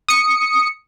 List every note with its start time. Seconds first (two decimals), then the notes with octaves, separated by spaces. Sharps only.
0.08 D#6 C#7